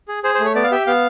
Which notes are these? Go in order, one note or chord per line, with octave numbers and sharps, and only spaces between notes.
G#4
G#4 C5
C5
A3
C#5
B3 D5
F5
G4 E5
B3 F5